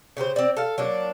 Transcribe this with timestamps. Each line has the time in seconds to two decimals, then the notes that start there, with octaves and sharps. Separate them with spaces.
0.17 C#3 G4 A4 C5
0.36 C4 D5
0.57 A4 F5
0.78 F#3 A#3 D4